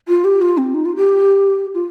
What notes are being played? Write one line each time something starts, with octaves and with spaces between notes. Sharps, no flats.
F4
G4
F4
C4
D#4
F4
G4
F4